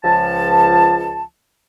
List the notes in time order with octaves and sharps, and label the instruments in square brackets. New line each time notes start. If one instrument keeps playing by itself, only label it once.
[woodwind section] C#2 F3 A5